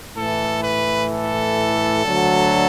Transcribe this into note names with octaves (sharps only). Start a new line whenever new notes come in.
A2 E3 A4
B4
A4
D2 D3 F#3